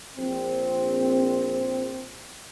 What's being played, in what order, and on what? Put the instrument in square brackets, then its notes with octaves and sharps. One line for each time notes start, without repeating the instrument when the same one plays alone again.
[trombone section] A#1 C4